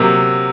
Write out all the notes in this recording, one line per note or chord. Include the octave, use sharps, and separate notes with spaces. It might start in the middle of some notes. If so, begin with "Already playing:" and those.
Already playing: C3 F#3 A#3